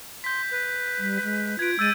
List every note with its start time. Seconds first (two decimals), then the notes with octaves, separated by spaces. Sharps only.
0.24 C6 G6 B6
0.51 B4
0.99 G3
1.22 G#3
1.59 F4 B4 G#6 D7
1.79 G#3 E6 G6 A6 D#7